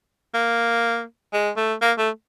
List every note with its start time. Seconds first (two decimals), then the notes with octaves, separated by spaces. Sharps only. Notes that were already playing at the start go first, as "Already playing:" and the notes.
0.34 A#3
1.33 G#3
1.57 A3
1.81 A#3
1.98 A3